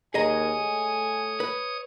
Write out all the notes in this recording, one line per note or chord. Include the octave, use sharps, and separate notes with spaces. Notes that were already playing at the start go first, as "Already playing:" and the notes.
D#2 G#4 C#5 D#5 G#5 A#5 D#6
A3
B4